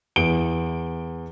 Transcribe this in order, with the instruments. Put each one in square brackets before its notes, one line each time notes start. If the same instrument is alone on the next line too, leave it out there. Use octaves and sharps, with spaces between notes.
[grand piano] E2 D7 G7